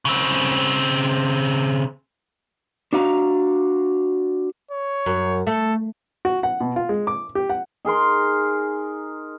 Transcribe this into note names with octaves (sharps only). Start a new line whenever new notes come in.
C#3 C4
D4 F#4 F5 A#5
C#5
F#2
A3 A4
F#4
F#5
B2
F4
G#3
D6
G4
F#5
D#4 G#4 A#4 C6